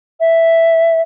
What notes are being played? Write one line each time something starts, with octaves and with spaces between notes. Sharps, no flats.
E5